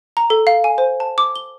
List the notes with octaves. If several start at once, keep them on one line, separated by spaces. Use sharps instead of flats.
A#5
A4
F5
G#5
C5
A5
D6
G7